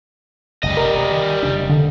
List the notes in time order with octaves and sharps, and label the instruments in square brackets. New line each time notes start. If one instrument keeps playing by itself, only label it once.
[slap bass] F#1 C#2 [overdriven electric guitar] G3 D#5
[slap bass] C3 [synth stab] A#4
[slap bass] D#3
F1 C#3 D4
[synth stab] D3